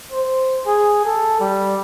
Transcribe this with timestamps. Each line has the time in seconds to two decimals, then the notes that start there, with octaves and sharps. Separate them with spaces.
0.12 C5
0.67 G#4
1.05 A4
1.40 G3